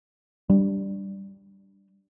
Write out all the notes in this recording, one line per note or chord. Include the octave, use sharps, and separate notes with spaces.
G3 D4